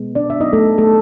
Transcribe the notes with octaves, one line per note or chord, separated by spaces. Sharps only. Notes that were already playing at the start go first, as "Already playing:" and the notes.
Already playing: B2 G#3 B3
D4 D5
E5
F#3 B3 D#4 D#5
A3 A4
A3 A4